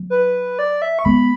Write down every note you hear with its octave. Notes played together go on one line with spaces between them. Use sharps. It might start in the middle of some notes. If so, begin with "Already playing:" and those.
Already playing: F#3
B4
D5
E5
C#6
G#3 B3 B5